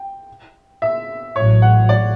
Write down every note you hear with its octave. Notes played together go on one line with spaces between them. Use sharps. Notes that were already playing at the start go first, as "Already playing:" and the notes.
Already playing: G5
E5
A1 A2 F#3 C#5
F#5
D5